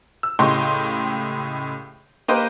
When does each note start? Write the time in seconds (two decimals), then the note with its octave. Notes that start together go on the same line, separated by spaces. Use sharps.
0.23 E6
0.39 C#2 A2 G4 D#5 C6 C#6
2.28 A#3 G4 B4 C5 D#5